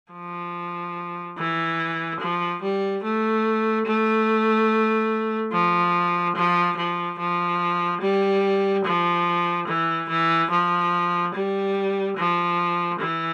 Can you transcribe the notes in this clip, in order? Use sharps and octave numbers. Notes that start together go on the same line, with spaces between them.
F3
E3
F3
G3
A3
A3
F3
F3
F3
F3
G3
F3
E3
E3
F3
G3
F3
E3